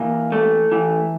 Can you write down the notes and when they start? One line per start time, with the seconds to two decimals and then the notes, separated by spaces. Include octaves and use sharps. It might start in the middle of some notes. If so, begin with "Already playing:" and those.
Already playing: E3 A#3
0.32 A3
0.72 E3